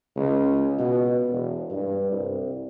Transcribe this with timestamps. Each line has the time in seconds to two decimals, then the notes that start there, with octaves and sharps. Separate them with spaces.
0.17 C#2
0.78 B2
1.31 E1
1.71 G2
2.12 C2